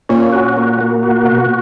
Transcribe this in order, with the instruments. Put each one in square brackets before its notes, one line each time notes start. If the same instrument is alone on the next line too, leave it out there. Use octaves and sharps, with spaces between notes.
[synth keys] A#2 [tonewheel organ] C#4
[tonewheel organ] F#4
A#3
A#3
F#4
B2